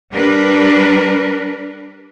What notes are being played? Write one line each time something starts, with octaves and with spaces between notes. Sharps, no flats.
G3 D4 A#4 B4